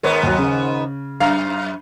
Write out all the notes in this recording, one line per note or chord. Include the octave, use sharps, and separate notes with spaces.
G#2 D#3 B3 A#4 C#5
D#2 F#3
C#3
F#2 F5 A#5 F6